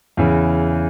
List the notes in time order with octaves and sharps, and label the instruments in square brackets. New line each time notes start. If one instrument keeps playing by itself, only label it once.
[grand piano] E2 C#3 E3